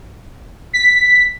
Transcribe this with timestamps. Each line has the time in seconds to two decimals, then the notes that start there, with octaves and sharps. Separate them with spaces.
0.73 B6